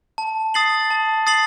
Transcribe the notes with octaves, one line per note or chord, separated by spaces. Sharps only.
A5
D#6 A6 C7 F#7
A5
D#6 A6 C7 F#7